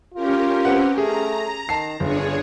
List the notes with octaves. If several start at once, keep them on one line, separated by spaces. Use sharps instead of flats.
C#4 F4 G4 A#4
C4 B4 F#5
A3 G#4 A#5
D#3 A5 C7
G1 C#3 D4 G#4 C#5